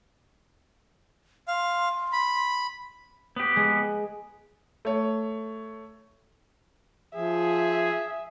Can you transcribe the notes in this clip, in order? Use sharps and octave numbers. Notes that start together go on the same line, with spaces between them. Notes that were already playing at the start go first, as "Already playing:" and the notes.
F5 C6
B5
B3 G4
G#3
A3 C#5
F3 G#4 E5